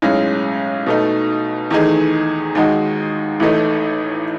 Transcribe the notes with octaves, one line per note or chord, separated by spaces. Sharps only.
B1 A2 G#3 C#4
B2 A3 D#4
E2 D#3 A3 D#4 G#4
D#2 D#3 G#3 D#4 F#4
A1 A2 E3 A3 D#4